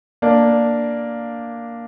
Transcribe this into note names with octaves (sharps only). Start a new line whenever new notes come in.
A#3 D4